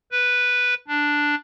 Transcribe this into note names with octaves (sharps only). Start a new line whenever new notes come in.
B4
D4